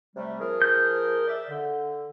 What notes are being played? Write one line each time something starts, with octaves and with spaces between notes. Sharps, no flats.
C3 G3 A3
F3 G#4 A#4
G6
D5 E5
D3